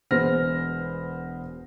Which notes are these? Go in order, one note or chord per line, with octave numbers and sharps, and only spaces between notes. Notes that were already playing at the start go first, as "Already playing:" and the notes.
E1 B3 G#4 C5 F6 A#6